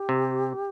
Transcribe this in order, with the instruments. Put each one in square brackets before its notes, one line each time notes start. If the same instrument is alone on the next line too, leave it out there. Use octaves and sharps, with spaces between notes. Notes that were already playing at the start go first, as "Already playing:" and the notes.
Already playing: [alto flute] G4
[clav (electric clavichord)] C3